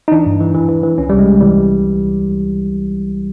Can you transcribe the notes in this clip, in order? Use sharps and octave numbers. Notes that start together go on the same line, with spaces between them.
D#4
E3 D4
G2
E3
E3
E3
E3
C2 C#4
C2 G3
G#3
C2
E3 G3